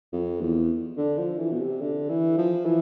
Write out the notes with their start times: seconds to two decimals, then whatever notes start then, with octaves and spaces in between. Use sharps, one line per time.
0.13 F2
0.41 E2
0.98 D3
1.18 F3
1.40 E3
1.52 B2
1.61 C3
1.82 D3
2.10 E3
2.38 F3
2.66 E3